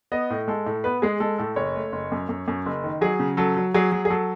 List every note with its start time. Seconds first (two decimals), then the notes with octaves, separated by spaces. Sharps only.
0.12 B3 D#5
0.30 A2
0.48 G#3 A4
0.66 A2
0.84 B3 B4
1.02 G#3 G#4
1.20 G#3 A4
1.38 A2 A4
1.56 F#1 C#5
1.76 A3
1.92 F#1
2.12 F#2
2.29 F#2
2.48 F#2
2.66 F#1
2.84 D#3
3.01 F#3 G#4
3.19 C#3
3.37 F#3 A4
3.57 F#3
3.74 F#3 G#4
3.92 F#3
4.05 G#4
4.10 F#3 A4